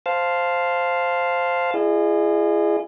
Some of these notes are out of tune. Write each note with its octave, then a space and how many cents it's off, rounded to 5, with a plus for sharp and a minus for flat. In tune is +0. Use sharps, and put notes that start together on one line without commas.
C5 +0 F5 +0 A5 +0
E4 +40 G#4 +0 D#5 -40